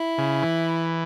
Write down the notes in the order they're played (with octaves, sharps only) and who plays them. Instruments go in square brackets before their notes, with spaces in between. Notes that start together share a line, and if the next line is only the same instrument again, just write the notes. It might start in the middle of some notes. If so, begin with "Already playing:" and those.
Already playing: [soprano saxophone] E4
[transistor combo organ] C#3
E3